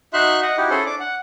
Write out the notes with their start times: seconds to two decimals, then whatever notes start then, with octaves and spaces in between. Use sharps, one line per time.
0.14 D#4 F#4 E5 C6 F#6
0.42 D#5 F#5
0.57 D#4 E4 F#4 G4
0.70 C#4 E4 G#4 A4 C5
0.86 D4 D6
1.00 F#5